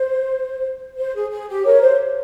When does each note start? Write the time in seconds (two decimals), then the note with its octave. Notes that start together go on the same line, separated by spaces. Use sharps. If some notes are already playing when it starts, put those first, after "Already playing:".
Already playing: C5
0.97 C5
1.15 G#4
1.30 G#4
1.49 G4
1.64 A#4 C#5
1.81 C5